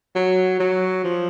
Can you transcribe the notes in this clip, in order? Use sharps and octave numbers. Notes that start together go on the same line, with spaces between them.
F#3
F#3
F3